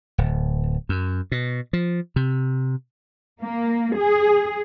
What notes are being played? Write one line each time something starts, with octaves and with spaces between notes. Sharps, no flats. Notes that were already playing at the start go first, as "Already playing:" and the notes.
D1
F#2
B2
F3
C3
A#3
G#4